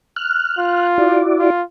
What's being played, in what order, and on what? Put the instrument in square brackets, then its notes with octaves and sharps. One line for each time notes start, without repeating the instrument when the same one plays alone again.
[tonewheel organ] F6 F#6
[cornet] F4
[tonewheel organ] E4 F#4 D5
[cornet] F4